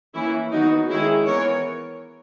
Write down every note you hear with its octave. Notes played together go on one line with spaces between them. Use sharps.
E3 A#3 C#4 E4
D#3 F#3 B3 D#4 F#4
D#3 G#3 C#4 E4 G#4
E3 B3 A#4 C#5